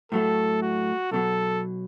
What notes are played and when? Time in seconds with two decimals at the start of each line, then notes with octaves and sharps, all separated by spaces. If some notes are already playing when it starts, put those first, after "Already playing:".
0.12 A2 F#3 A3 A4
0.62 F#4
1.11 B1 B2 F#3 A4